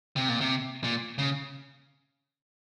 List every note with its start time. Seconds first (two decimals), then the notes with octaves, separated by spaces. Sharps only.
0.16 C3
0.29 A#2
0.41 C3
0.84 A#2
1.18 C#3